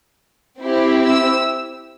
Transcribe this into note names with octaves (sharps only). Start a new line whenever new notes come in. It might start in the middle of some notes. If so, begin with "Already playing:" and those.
C4 E4 G4
E6